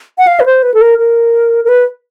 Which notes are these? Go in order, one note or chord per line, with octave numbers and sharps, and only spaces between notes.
F#5
F5
B4
C5
B4
A4
A#4
A#4
A#4
B4